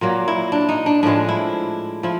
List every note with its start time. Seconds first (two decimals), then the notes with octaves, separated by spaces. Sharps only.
0.01 A#2 F#3 A#3
0.28 E4
0.52 D4
0.69 D#4
0.86 D4
1.03 A2 F3 G#3 D4
1.29 E4
2.03 F3 E4